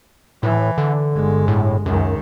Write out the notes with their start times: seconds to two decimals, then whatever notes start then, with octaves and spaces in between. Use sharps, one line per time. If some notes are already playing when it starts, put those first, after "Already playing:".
0.43 A2 E3
0.78 D3
1.13 G1 G#3
1.48 A2
1.86 C#2 F#2 D#3